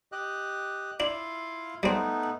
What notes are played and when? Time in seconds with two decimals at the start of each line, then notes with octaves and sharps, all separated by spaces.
0.12 G4 D#5 F#6
1.00 D4 E4 F4 F5
1.83 G3 A3 B3 C4 D#4